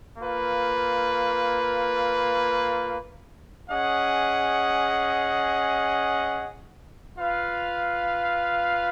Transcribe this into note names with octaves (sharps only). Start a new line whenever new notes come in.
A#3 F4 B4
C#4 G#4 D#5 F#5
F4 B4 F5